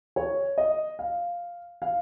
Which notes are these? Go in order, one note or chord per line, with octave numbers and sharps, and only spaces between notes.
C#5
D#5
F5
F5